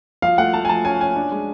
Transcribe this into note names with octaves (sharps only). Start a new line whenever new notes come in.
F3 F5
A3 F#5
A3 A5
G#5
F3 A5
C#4 G#5
C#4 G#5
D4
G#3